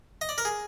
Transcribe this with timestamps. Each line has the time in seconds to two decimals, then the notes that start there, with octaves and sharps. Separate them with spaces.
0.21 D#5
0.29 D5
0.38 A#4
0.45 G#4